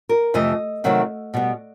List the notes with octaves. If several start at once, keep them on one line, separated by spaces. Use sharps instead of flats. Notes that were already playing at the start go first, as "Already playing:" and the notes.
A#4
F2 C3 E3 A3 D#5
C3 D#3 F#3 A3 C4
B2 G3 B3